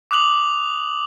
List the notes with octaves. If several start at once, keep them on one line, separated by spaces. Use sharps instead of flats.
D6 D#6 F#6 F7 F#7